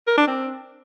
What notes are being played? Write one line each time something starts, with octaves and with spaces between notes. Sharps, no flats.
A#4
D4
C4